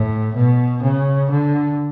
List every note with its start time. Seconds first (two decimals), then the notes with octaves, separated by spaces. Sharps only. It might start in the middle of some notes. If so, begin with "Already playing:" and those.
Already playing: A2
0.35 B2
0.82 C#3
1.30 D3